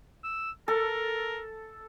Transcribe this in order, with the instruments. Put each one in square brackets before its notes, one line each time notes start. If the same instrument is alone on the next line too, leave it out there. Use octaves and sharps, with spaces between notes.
[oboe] E6
[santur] A4 [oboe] A#4